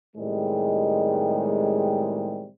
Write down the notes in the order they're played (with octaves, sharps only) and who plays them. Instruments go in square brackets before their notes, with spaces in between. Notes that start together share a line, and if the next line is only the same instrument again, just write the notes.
[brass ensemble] A2 C3 D#3 G3 G#3